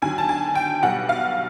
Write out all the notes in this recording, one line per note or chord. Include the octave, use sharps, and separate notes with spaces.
D#2 D3 F#3 G#5
A5
G#5
G5
B1 B2 G3 F#5
F5